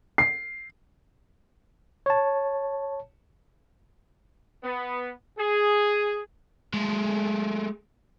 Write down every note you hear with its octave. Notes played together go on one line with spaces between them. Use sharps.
C7
C#5 A5
B3
G#4
G#3 A3